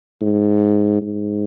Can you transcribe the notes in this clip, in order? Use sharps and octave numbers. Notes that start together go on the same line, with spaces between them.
G#2
G#2